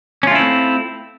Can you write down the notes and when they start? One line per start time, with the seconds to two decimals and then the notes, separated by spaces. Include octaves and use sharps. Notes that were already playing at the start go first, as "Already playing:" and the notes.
0.23 C#4
0.27 F4
0.31 A3
0.35 E4
0.39 C4